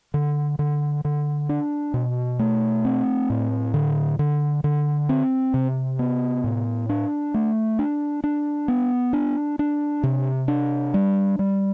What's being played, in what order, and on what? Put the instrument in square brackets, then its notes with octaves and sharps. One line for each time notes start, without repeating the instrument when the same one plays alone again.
[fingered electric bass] D3
D3
D3
D4
B2
A3
C4
A2
D3
D3
D3
C4
C3
B3
A2
D4
A3
D4
D4
B3
D4
D4
C3
D4
G3
G3